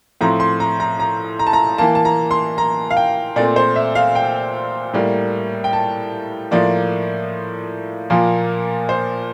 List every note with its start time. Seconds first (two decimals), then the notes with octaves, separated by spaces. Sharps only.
0.21 A2 F3 C4 A#5
0.40 C6
0.60 A#5
0.80 A#5
1.00 A#5
1.39 A#5
1.47 A5
1.53 A#5
1.78 E3 A#3 A5
1.95 A5
2.05 A#5
2.31 C6
2.58 A#5
2.90 F5
2.97 G5
3.36 A#2 A3 C4 D5
3.56 C5
3.76 E5
3.95 F5
4.15 G5
4.93 A2 G3 A#3
5.64 G5
5.73 A5
6.51 A2 F3 A#3 D5
8.10 A#2 F3 A#3
8.89 C5